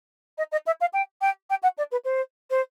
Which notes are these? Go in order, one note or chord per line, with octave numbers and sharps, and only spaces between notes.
D#5
D#5
E5
F5
G5
G5
G5
F#5
D5
B4
C5
C5